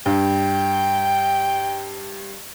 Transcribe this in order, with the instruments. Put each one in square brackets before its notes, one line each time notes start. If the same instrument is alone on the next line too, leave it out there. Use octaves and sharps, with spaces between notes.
[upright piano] G2 [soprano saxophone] G5